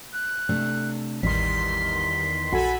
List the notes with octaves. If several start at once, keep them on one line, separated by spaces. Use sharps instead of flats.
F#6
C3 A3 D4
A1 E2 D#3 G3 C6 B6
A#1 F#4 A4 G#5 B5